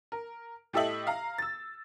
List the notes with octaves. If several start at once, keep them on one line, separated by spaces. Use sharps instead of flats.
A#4
A2 G4 A4 D#5 E5 F#7
F5 A#5
E6 A6